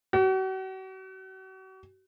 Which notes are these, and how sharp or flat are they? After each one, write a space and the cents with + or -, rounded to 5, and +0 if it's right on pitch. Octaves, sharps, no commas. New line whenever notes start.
F#4 +40